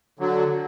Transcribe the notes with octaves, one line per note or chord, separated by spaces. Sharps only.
D3 F#3